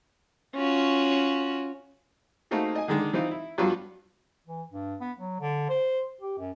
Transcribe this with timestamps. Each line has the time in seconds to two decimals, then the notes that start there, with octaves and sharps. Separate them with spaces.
0.56 C#4 F4 F#4
2.51 A3 A#3 C4 D#4 F#4 G#4
2.75 D#5 G#5
2.88 D3 D#3 G#3 D4
3.13 E3 C4 D#4 F4
3.31 E4
3.58 G2 F3 F#3 B3 F4 F#4
4.47 E3
4.72 G2
5.01 B3
5.19 F#3
5.41 D3
5.70 C5
6.21 G4
6.38 F#2